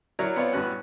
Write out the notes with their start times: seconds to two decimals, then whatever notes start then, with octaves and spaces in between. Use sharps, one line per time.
0.19 F#3 E4 A#4 C#5 D5
0.36 B3 C4 F4 C#5 D5
0.53 A1 G2 B3 C#4 F#4 F#6